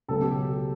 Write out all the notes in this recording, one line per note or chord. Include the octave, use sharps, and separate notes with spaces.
C#2 B2 F#3 A3 A4
G4